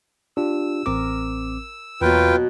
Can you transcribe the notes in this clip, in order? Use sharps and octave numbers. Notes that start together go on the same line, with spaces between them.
D4 F4 G4 E6
A1 C4 A#4 D6
E2 B2 F#3 A#3 F4 B4 G5